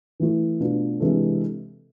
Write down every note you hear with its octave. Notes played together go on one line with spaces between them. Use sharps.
E3 A3 E4
B2 A3 D4 F4
C3 E3 G#3 D4 A4